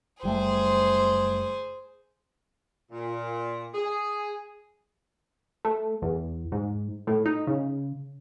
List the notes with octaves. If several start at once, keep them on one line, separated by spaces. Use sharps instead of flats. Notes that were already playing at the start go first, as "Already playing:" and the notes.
F#1 G3 A3 G#4 C5
A#2
G#4
A3
E2
G#2
A2
D#4
C#3